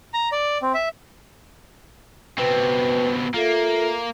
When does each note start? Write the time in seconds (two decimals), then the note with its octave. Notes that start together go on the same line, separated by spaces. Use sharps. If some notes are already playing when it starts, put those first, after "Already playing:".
0.14 A#5
0.32 D5
0.62 C4
0.74 E5
2.38 B2 C4 B4 G5
3.34 A#3 F4 A4 E5